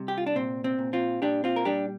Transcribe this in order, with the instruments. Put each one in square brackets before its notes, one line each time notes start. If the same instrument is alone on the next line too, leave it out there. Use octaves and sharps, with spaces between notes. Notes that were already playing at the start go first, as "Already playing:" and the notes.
Already playing: [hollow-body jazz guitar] C3 G3
G4
F4
D4
A#2 C4
C4
A#2
C4 F4
A#2 D4 G4
C4 F4
A#4
G3 D4 G4